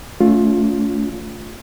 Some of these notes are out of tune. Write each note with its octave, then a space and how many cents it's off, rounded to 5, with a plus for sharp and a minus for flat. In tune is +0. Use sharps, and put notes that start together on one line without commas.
A3 +0 C#4 +45 F4 +15